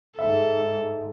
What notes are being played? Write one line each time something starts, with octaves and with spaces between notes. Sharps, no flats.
G#2 A4 E5